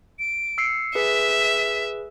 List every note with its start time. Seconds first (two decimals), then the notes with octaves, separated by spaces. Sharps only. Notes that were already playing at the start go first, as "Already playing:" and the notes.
0.19 D7
0.58 E6 C7 C#7
0.95 G#4 B4 E5 B6